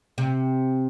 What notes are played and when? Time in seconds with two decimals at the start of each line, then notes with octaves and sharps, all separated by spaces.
0.18 C3